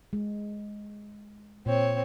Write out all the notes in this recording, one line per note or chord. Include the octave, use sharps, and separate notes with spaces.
G#3
A#2 C4 C#5